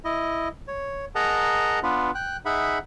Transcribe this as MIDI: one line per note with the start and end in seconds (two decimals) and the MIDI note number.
0.05 0.48 64
0.05 0.48 75
0.68 1.05 73
1.15 1.79 68
1.15 1.79 70
1.15 1.79 75
1.15 1.79 78
1.15 1.79 81
1.15 1.79 82
1.83 2.11 59
1.83 2.11 62
1.83 2.11 65
1.83 2.11 71
2.15 2.37 79
2.15 2.37 90
2.46 2.78 63
2.46 2.78 68
2.46 2.78 76
2.46 2.78 78
2.46 2.78 83